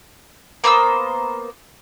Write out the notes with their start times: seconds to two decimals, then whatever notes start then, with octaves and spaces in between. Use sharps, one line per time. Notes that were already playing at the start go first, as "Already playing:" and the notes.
0.64 A#3 B3 C5 E6